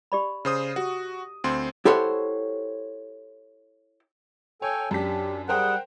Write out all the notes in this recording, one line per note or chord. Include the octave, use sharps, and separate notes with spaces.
G4 D5 B5
C#3 C5 D#6
F#4 G4
D2 C4 C6
E4 G4 A4 C5 C#5 F#5
A4 C#5 G5 G#5
F#2 D4 G4 A5 B6
G3 G#4 A#4 C5 F#5 G5